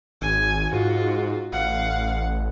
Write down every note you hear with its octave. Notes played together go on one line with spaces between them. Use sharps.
G#1 G#5
G#2 F4 F#4
A1 F5 F#5